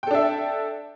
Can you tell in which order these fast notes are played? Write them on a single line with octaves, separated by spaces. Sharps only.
G5 A4 D4 E5